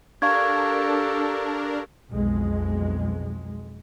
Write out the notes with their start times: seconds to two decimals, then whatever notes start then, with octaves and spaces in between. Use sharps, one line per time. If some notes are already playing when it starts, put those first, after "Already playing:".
0.22 D4 G4 A4 A#4 F5 C#6 G#6
2.11 B1 F2 G#3